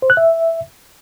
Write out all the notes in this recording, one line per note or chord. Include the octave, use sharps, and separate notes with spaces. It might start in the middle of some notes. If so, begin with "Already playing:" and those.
C5
F#6
E5